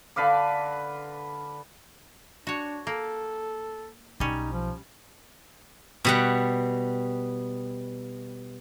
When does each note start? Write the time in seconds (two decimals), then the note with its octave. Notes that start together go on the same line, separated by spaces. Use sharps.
0.16 D3 B4 F5 D6
2.47 D4 F#4 C#5
2.87 A#3 A4
4.20 B1 G3 C#4 D#4
4.52 F3
6.05 B2 G3 F#5